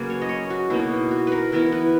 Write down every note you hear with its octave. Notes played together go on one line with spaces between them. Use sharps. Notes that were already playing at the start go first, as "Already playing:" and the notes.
Already playing: C#3 F#3 A#3 B4
C#5
D#5
C#5
F#4
B2 A#3 D#4 E4
F#4
A#4 B4
E3 B3 E4 A#4
B4